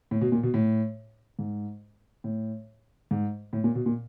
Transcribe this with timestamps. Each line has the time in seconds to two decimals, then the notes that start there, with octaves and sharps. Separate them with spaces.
0.11 A2
0.21 B2
0.32 A#2
0.43 B2
0.54 A2
1.39 G#2
2.24 A2
3.11 G#2
3.53 A2
3.64 A#2
3.75 B2
3.86 A#2